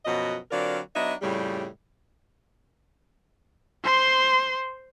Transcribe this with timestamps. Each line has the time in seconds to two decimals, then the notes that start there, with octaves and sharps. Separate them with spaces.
0.05 F#2 B2 F3 F#4 D#5
0.51 D3 F#3 C4 F4 A#4 D5
0.95 F#3 B3 D4 D#4 D#5 E5
1.22 F2 A2 C#3 G3
3.85 C5 C6